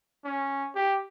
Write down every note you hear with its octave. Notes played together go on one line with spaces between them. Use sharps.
C#4
G4